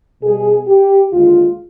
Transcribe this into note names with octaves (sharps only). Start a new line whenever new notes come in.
B2 G3 G#4
G4
D#2 D3 G#3 F4